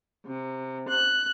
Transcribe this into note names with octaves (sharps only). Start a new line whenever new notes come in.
C3
F#6